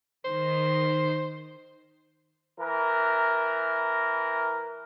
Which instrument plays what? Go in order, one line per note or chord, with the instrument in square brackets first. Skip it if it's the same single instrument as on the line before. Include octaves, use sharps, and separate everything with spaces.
[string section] D#3 [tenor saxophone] C5
[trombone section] E3 A#4